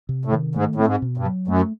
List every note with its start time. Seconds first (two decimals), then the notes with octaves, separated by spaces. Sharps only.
0.09 C3
0.25 A2
0.33 D#3
0.55 G#2 A3
0.75 A2 C4
0.87 G#2
1.02 B2
1.17 G2
1.25 F#3
1.48 F#2 A3